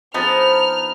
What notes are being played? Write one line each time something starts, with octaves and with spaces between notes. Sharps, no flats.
F3 B3 D4 D#4 G#4 A5 F6